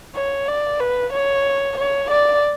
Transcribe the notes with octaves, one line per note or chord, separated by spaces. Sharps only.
C#5
D5
B4
C#5
C#5
D5